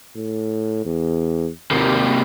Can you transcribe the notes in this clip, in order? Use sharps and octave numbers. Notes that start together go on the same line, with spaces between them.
A2
E2
D#2 C3 A#3